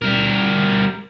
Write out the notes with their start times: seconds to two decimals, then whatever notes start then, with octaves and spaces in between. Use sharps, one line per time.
0.02 G3 A#4